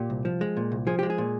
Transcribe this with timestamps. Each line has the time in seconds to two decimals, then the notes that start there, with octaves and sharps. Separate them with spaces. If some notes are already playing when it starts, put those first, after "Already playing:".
Already playing: A#2 G4
0.10 C2
0.25 F3
0.41 G#3
0.57 A#2
0.72 C2
0.87 F3 G#4
0.99 G#3 G4
1.10 G#4
1.18 A#2